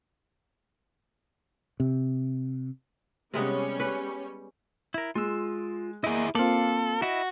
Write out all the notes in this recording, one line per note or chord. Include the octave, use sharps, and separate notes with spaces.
C3
C3 G3 G#3 B3 C#4
B4
E4 A#4
G#3 F4 E6
A#3 E4 G#4 D#5
A#3 C4 F4 A4 F5 D6 F#7
E4 F#4 D#5